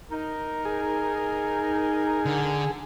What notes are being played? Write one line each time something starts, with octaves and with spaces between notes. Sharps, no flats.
D#4 A#4
G#4
D3